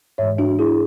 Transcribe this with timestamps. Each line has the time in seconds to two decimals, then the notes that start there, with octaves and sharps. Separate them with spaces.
0.18 G#2 E3 G#3 C#5 E5
0.38 D4 F#4
0.59 E4 G#4